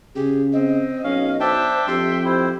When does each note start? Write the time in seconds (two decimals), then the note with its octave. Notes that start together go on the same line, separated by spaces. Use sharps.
0.16 C#3 G4 G#4
0.53 C4 D#5
1.04 B1 C#4 F5
1.40 D4 C5 E5 G5 A5
1.88 F2 G4 E5 C6
2.25 E4 C5